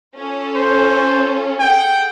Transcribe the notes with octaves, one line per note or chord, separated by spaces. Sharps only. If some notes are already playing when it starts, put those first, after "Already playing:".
C#4 F4 A4
C5
G#4 A4 F#5 G5